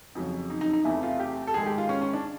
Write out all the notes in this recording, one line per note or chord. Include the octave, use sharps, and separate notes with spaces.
F2 C#3 F#3
D#4
D#4
D#4
E2 C3 E3 A3 E4
F4
G4
A4
G#2 D#3 G#3 G#4
G4
F4
C#4
C#4
D4